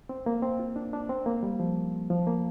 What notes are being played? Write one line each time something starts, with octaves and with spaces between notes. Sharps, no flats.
C4
A#3
C4
F4
D4
D4
C4
A#3
G3
F3
F3
A#3